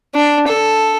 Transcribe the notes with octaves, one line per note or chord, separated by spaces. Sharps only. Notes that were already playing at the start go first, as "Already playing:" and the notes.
D4
A4